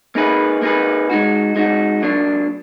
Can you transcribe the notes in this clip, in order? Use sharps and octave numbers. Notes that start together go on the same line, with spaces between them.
A#3 D#4 G#4 B4
A#3 D#4 G#4 B4
G#3 D#4 F#4
G#3 D#4 F#4
F#3 A#3 D4